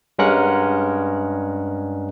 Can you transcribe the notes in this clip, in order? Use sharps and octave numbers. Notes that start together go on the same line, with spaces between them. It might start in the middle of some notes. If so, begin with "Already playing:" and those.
G2 G#3 C#4 A#4 F#5 F#6